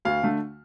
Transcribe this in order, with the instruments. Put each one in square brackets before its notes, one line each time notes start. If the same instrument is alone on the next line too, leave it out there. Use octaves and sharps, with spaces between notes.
[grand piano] D2 F5
D3 A3